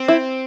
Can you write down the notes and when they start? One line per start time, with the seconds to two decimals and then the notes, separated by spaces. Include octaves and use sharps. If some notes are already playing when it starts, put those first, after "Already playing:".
Already playing: C4
0.08 E4